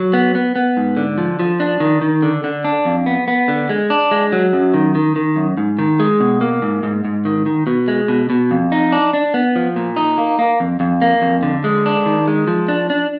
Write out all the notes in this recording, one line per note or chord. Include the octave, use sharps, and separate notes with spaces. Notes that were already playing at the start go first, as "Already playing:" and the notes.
Already playing: F#3
B3
B3
B3
G#2
D3
F3
F3
D4
D#3
D#3
D3
D3
D4
F2
B3
B3
D3
G#3
D4
G#3
F#3
F#2
D#3
D#3
D#3
F#2
G#2
D#3
G#3
B2
A#3
G#2
G#2
G#2
D#3
D#3
B2
G#3
B2
B2
F2
D#4
D4
D4
B3
F3
A#2
D#4
A#3
A#3
F2
F2
A#3
F2
D3
G#3
D4
D#3
G#3
F3
D4
D4